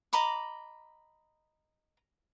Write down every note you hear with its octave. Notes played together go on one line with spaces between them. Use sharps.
D#5 A#5 B5 D6